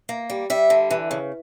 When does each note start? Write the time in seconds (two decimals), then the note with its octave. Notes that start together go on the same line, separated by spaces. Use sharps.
0.09 A#3
0.30 G3
0.50 G3 E5
0.70 D3
0.91 E3
1.11 C#3